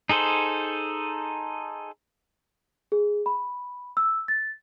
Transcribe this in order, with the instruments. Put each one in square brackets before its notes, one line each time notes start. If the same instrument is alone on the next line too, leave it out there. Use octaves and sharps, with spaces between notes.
[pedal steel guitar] D#4 G#4 A4 C5
[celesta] G#4
B5
E6
A6